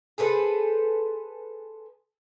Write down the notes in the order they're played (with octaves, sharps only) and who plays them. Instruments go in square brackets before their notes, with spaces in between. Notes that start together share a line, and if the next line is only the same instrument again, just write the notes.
[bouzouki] G#4 A4 B4 C5